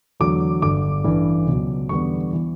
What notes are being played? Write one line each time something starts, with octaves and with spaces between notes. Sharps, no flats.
E2 D3 F#3 A3 D6
G1 G2 D3 D6
A1 G2 E3 A3
C#2 B2 F#3
E2 D3 G3 B3 C#6
E3 B3